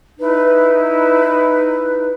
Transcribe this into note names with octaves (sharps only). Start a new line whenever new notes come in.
D#4 E4 B4